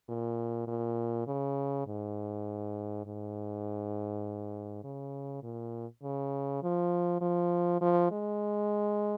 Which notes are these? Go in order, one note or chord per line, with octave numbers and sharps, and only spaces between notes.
A#2
A#2
C#3
G#2
G#2
C#3
A#2
C#3
F3
F3
F3
G#3